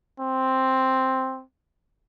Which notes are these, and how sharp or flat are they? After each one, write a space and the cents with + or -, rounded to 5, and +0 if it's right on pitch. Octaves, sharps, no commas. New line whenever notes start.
C4 +5